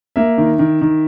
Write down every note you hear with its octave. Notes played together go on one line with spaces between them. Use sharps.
A#3 E5
D#3
D#3
D#3